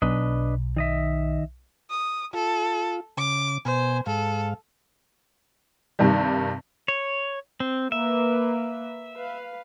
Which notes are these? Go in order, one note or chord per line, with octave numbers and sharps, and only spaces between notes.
B1 D4 B4 D#5
D#3 D#5 E5
D#6
F4 A4
C#3 D6
B2 C5 G#5
G#2 A4 F5
G2 C3 D#3 G3
C#5
C4
A#3 B4 E5
B4 F5